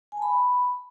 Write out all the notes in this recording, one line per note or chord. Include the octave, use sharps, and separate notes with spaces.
G#5
A5
B5